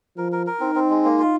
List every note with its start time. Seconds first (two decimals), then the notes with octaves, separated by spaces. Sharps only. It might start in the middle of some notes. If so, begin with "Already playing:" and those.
0.17 F3 A#4
0.32 A#4
0.47 A#4
0.60 C4 D#4
0.75 C4
0.90 G#3
1.04 A#3
1.19 F4